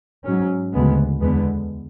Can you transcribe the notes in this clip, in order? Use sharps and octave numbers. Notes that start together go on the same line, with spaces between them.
G#2 F#3 C#4
D2 C#3 G#3 B3
E2 D3 G#3 B3